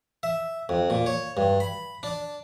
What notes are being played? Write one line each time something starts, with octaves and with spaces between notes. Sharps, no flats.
E5
F2
A#2
C#5
G2
B5
D4